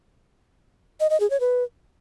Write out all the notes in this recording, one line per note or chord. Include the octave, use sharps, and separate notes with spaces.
D#5
D#5
G#4
C#5
B4